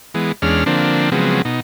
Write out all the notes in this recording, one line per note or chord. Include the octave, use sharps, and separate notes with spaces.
E3 G#3 B3
E2 G#3 C#4 D4 F6
D3 F3 A#3 C4 D4
C#3 F3 F#3 G#3 B3 C4
B2 D#4